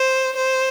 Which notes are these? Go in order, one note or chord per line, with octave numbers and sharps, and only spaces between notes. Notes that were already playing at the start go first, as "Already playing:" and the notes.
Already playing: C5
C5